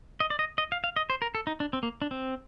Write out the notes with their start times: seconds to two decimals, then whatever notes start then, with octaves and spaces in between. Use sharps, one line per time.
0.20 D#5
0.30 D5
0.39 D#5
0.58 D#5
0.72 F5
0.84 F5
0.96 D#5
1.10 C5
1.22 A#4
1.35 A4
1.47 D#4
1.60 D4
1.73 C4
1.83 A#3
2.02 D4
2.11 C4